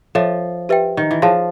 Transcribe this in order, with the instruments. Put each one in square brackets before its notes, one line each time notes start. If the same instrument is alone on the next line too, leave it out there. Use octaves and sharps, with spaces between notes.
[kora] F3 [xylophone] A4 C#5 E5
[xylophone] G4 B4 E5 G5
[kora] D#3
E3
[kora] F3 [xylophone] G#4 C#5 F5 A5 C6